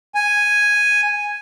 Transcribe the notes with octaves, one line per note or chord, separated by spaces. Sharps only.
G#5